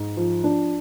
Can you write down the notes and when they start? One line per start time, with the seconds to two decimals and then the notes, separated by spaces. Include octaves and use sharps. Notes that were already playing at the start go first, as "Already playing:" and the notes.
Already playing: G#2
0.17 F3
0.44 D4